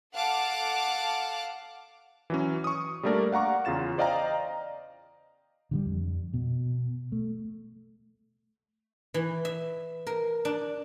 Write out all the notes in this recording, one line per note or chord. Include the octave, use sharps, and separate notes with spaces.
A4 F5 F#5 A5 D6 F#6
E3 F#3 C#4
C#6 D#6
G3 A3 A#3 D4 A#4 D5
F5 F#5 A#5 C#6 D6
E2 C#3 F4 A6 E7
C5 D5 D#5 F5 G5 A#5
D3 F#3 G3
F2
B2
A3
E3
E5
A#4
D4